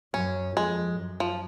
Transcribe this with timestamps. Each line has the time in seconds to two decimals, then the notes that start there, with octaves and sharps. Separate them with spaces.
0.13 F#2 C#4
0.56 F2 G#3
0.99 F#2
1.20 F3